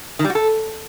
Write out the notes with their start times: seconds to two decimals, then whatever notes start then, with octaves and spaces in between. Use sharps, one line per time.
0.19 D#3
0.25 G3
0.30 F#4
0.35 A4